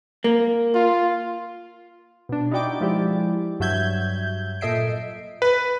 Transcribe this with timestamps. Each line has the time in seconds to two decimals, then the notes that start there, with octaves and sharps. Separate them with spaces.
0.24 A#3
0.74 F4
2.29 B2 D4
2.51 D#4 E4 F#4 D5 G5 D6
2.81 F3 G#3 E4 G4 D5
3.60 G2 F#3 E5 G6 G#6
4.61 A#2 A4 D#5 E5 C7 D7
5.42 B4